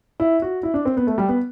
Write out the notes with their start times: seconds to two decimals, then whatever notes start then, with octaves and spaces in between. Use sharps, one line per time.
0.20 E4
0.42 F#4
0.63 E4
0.74 D4
0.85 C4
0.97 B3
1.07 A3
1.18 G3
1.29 B3